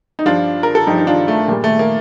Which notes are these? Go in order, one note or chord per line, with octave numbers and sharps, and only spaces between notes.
D#4
G2 F3 D4 F4
A#4
A4
G2 F3 D#4 G4
D#4
D4 F4
A3
A#2 G3
A3
A#3